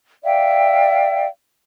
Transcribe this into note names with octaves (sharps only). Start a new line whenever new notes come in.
D5 E5 F5 G5